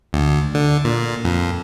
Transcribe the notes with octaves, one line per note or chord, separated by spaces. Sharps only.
D2
D3
A#2
F2